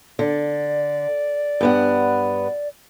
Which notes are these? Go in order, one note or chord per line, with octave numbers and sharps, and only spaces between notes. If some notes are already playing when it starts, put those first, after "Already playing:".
D3 D5
G2 B3 F#5